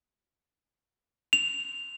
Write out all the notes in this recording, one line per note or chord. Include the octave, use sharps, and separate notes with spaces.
F7